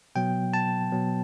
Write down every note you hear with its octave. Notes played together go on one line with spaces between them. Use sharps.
B2 F#3 B3 G5
A5
B2 F#3 B3